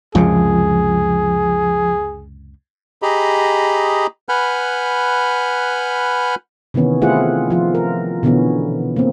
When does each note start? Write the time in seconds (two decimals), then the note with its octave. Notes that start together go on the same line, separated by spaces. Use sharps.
0.15 C#2 F#2 C3 F3 G#4
3.02 G4 G#4 D#5 A#5 B5
4.29 B4 F#5 G#5 B5 F6 G6
6.74 C3 D#3 E3 B3 C#4
7.01 A3 C4 E4 F4 G#4 F#5
7.50 F3 F4
7.75 A#4
8.23 B2 D3 E3 B3 C#4
8.96 A#3 C4